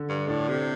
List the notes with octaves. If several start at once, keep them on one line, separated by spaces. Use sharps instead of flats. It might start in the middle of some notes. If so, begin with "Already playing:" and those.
Already playing: D3
G2
A2 D4
C3